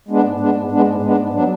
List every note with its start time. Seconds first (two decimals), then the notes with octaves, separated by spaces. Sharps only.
0.08 G#3 B3 D4
0.23 G#2
0.40 G#3 B3 D4
0.55 G#2
0.71 G#3 B3 D4
0.86 G#2
1.02 G#3 B3 D4
1.18 G#2
1.33 F#3 B3 D4